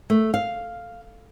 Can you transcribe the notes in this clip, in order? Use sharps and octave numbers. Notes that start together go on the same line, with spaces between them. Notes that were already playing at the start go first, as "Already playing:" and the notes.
A3
F5